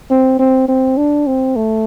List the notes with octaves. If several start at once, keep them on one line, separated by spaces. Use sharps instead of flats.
C4
C4
C4
D4
C4
A3